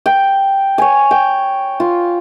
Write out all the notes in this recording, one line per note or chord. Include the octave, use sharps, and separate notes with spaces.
G5
C#5 G#5
G5
F4